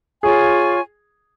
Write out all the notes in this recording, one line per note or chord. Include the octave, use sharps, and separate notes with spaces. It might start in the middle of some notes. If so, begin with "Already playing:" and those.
F4 G#4 C#5 G#5 C#6